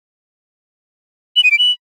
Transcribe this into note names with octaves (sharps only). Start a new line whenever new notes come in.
F#7
D#7
D7
F#7